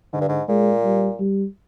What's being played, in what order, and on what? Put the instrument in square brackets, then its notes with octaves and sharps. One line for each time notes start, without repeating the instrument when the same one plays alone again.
[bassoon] G#2 [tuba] D3
[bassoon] G2
G#2
[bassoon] A#2 [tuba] G#3
[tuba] G3
G3